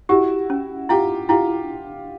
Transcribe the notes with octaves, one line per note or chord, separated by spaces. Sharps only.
E4 F#4 G4
C#4
E4 F4 G4
E4 F4 G4